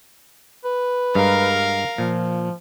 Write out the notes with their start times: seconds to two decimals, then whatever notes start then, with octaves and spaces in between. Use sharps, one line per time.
0.65 B4
1.15 G2 G#3 A#4 F5 A#5
1.98 A#2 F3